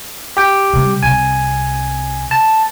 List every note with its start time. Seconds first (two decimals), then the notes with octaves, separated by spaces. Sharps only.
0.37 G4 G5
0.73 C3 G3
1.03 C2 C3 G#5
2.31 A5